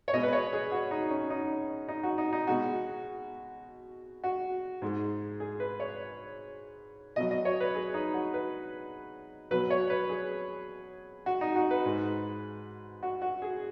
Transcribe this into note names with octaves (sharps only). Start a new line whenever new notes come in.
C#5
B2 G#3 D#5
B4
C#5
G#4
F#4
D#4
C#4
D#4
D#4
F#4
D#4
D#4
B2 G#3 F#4
F#4
G#2 G#3
G#4
B4
C#5
B2 F#3 D#5
D#5
C#5
B4
G#4
D#4
F#4
B4
B2 F#3 B4
C#5
B4
G#4
F#4
D#4
F#4
B4
G#2 G#3
F#4
F#4
G#4